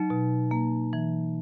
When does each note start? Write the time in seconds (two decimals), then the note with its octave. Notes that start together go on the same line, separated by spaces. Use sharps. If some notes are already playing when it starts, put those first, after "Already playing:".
Already playing: F#3 D#4
0.10 B2
0.51 A#3
0.93 E3